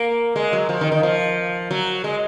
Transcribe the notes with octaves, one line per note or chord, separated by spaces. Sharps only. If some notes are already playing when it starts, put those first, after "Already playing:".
Already playing: A#3
G#3
F#3
F3
D#3
D#3
F3
F#3
G#3